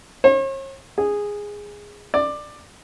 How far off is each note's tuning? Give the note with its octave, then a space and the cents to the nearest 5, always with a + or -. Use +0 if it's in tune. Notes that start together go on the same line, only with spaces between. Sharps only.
C#5 -45
G#4 -10
D5 +15